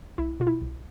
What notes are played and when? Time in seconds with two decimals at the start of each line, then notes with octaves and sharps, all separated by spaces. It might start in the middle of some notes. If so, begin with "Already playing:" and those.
0.18 C2 E4
0.40 B2 F4
0.47 E4
0.62 C2